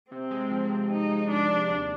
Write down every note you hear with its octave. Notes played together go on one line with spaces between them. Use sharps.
C3 C4
G#3
F3
C3
C3 D#4
G#3
F3 D4
C3
D#2